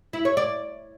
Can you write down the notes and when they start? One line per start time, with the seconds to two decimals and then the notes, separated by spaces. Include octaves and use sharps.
0.13 E4
0.25 C#5
0.37 D5